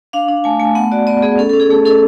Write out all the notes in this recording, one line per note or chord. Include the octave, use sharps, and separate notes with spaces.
D4 F5
D4
A3 G#5
A3 G#5
B3 F#5
F#4 D5
B3 D5
B3 G#4
C#4 A4
C#4 A4
G#4
A3 G#4
C#4 A4